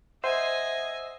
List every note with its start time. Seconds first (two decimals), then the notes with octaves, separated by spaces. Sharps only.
0.24 C5 D#5 E5 F#5 G#5